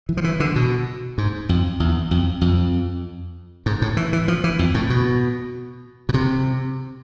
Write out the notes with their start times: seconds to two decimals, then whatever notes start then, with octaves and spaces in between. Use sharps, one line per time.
0.09 E3
0.17 F3
0.24 E3
0.40 D3
0.56 B2
1.18 G#2
1.49 F2
1.80 E2
2.11 F2
2.41 F2
3.66 G#2
3.82 A2
3.97 E3
4.13 E3
4.28 F3
4.44 E3
4.59 F2
4.74 A2
4.90 B2
6.09 B2
6.14 C3